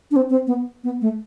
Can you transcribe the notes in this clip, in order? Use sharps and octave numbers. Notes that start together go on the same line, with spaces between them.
D4
C4
C4
B3
B3
A3